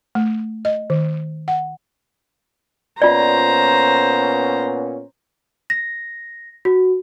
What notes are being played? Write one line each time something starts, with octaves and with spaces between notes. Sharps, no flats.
A3
D#5
D#3
F#5
A#2 B3 C#4 F4 C5 D5 A#5
A#6
F#4